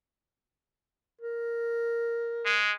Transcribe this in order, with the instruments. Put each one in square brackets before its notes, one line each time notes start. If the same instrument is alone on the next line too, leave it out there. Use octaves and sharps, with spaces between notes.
[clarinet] A#4
[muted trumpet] G#3